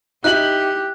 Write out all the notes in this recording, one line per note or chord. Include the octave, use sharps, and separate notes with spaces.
D#4 E4 G4 F#6 F#7